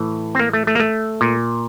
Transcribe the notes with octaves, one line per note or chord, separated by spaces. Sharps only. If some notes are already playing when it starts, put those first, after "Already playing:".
Already playing: A2 E3
C4
A#3
A3
A3
A#3
A3
A#2